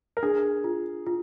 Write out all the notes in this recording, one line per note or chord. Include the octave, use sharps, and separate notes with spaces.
A#4
D4 G#4
F4
F4